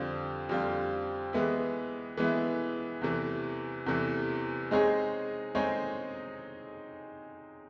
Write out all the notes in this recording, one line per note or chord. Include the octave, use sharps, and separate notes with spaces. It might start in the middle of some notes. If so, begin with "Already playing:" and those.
Already playing: F2 D3 G3 C4 F4
F2 D3 G3 C4 F4
E3 G#3 B3 E4
E3 G#3 B3 E4
E2 C3 E3 A3
E2 C3 E3 A3
G#3 C4 D#4 G#4 C#5
G#3 C4 D#4 G#4 C#5